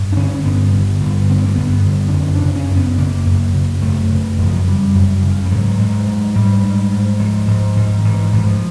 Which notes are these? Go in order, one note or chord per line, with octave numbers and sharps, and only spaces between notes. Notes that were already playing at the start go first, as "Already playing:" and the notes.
Already playing: G2
D4
D3 C#4
G2 B3
D3
G2
D3 C4
B3
A#3
G2 B3
D3
D4
F#2 C#4
D4
C#3
C#4
F#2
B3
C#3 A#3
F#2
C#3
F#2 A3
C#3
F#2 F3
F#3
C#3 G3
F#2
C#3
G3
G#2 F#3
G#2
G#2
G#2 G3
G#2
G#2
G#2 F3
G#2
G#2
D#3
G#2 E3
G#2 E3
F3